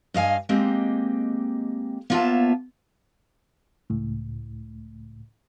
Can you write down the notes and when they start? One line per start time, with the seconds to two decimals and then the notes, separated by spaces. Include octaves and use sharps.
0.14 G2 D#5 F5 G#5
0.49 G#3 A#3 C4 G4 D#5
2.10 A#3 B3 F4 C#5 E5 A5
3.90 C#2 A2